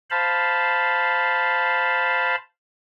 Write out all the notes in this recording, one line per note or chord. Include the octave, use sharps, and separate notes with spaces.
C5 F5 A5 B5